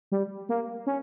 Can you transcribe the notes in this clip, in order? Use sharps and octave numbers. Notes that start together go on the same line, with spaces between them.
G3
A#3
C#4